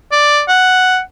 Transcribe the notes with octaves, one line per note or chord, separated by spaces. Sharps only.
D5
F#5